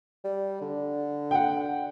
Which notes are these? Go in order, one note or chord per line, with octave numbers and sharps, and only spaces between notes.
G3
D3
F#5 G5